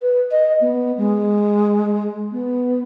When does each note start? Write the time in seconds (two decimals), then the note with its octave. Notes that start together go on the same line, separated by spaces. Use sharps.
0.02 B4
0.31 D#5
0.61 B3
0.98 G#3
2.32 B3